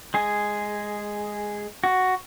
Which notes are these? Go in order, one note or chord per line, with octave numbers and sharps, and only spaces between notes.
G#3 G#4
F#4